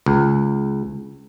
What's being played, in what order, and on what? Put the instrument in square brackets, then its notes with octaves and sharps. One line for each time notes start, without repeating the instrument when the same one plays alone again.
[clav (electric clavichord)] C#2